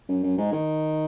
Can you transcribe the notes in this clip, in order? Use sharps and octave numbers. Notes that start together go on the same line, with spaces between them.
F#2
F#2
G#2
D#3